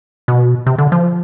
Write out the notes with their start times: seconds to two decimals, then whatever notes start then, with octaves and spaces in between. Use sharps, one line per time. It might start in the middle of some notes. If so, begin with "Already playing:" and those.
0.28 B2
0.66 C3
0.78 D3
0.92 F3